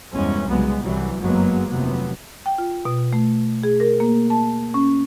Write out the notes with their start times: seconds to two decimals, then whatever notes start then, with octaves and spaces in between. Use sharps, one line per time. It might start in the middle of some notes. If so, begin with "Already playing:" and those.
0.13 E2 G2 C3 G#3 C#4
0.48 C2 C#3 F#3 G#3 B3
0.82 C2 E3 F#3 G3
1.19 F#1 G2 F#3 G#3 A#3 B3
1.69 F1 D#2 C3 F#3 B3
2.46 G5
2.58 F4
2.85 B2
3.13 A3
3.63 G#4
3.80 A#4
4.00 A#3
4.30 A5
4.74 C#4